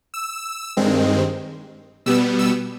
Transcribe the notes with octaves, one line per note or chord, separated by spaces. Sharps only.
E6
G2 D#3 G#3 C4
B2 G3 B3 E6
E6